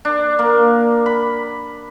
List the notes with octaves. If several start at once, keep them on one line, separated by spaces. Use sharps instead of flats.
D4
A#3
B5